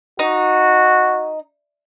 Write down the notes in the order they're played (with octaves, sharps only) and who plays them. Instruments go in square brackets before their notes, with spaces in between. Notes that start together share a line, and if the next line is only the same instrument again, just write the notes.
[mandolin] D#4 [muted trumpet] F#4